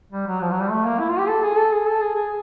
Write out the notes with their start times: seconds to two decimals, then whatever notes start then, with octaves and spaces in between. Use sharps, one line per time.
0.12 G3
0.27 F#3
0.41 F3
0.51 F#3
0.61 G3
0.70 A3
0.85 A#3
0.99 E4
1.09 F4
1.19 G4
1.29 A4
1.43 G#4
1.57 A4
1.72 G#4
1.87 A4
2.01 G#4
2.15 G#4